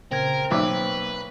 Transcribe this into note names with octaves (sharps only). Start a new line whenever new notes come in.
A#2 C#3 C4 A#4 G#6
B1 A#3 B4 E5 D6